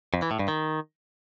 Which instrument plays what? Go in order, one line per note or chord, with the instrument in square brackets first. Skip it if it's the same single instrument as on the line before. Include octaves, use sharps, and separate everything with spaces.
[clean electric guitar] F2
E3
A2
G2
D#3